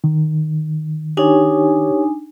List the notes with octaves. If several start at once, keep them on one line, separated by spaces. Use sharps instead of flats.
D#3
D4 D#4 G4 C#5 G#5